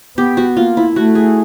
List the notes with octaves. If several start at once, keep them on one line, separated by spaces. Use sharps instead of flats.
B3 G4
F#4
A#3 F4
E4
A3 F#4
G#4